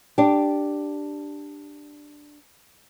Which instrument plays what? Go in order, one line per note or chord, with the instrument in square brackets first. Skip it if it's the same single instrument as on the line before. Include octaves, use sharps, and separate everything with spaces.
[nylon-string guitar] D4 G4